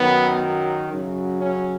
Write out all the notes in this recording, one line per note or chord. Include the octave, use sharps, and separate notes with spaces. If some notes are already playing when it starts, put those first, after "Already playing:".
Already playing: F#2 D#3 F#3 B3
F#2 C#3 F#3
C#4